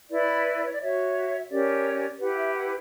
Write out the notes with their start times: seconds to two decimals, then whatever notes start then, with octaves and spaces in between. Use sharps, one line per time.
0.10 E4 B4 D5
0.64 C#5
0.73 D5
0.80 F#4 C#5 E5
1.49 C#4 G4 A#4 C#5 D5
2.19 E4 G4 B4 F#5
2.37 E5
2.54 F#5